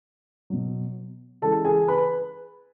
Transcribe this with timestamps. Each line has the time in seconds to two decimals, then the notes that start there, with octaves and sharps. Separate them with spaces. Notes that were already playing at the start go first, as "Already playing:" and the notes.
0.50 B2 F#3
1.41 C#3 E3 G#3 A4 A5
1.65 G#4 G#5
1.88 B4 B5